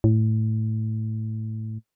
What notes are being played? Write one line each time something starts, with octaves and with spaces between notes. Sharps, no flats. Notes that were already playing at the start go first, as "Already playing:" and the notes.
A2